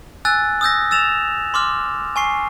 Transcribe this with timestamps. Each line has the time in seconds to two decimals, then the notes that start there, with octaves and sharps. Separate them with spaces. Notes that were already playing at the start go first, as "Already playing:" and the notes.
0.25 G#5 E6 F#6 A6
0.61 D#6 E6 G6 A#6
0.91 E6 A6 E7 F7
1.54 C6 D6 F6
2.16 G#5 C#6 C7